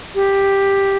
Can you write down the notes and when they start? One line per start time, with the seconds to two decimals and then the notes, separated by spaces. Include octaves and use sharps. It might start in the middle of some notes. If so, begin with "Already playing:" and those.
0.15 G4